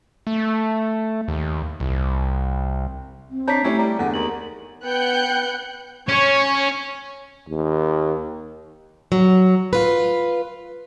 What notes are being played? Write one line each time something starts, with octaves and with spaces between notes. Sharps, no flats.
A3
D#2
C2
C4
D4 C#5 A5 A#5 G6 B6 C7
A3 C#4 E4 G4 C#5
G3 A#5
E2 D3 F#5
D#2 A#4 F#7
B3 G5 F#6 G6 C#7
C#4 C#5
D#2
F#3
F4 B4